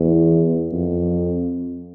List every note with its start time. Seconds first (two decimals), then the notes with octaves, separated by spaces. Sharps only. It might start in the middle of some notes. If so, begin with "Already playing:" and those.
Already playing: E2
0.72 F2